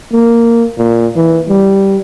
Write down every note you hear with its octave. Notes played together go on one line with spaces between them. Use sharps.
A#3
A#2
E3
G3